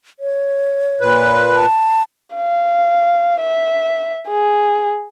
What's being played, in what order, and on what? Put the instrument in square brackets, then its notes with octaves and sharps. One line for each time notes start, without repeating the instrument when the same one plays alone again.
[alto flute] C#5
[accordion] A#2 B4
[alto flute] A5
[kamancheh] F5
E5
G#4